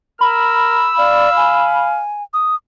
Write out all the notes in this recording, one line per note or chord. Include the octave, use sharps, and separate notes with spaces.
A#4 B5 E6
D5 F5
G#5
D#6